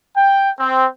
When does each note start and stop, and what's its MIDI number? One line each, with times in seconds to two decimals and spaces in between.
0.17 0.50 79
0.59 0.87 60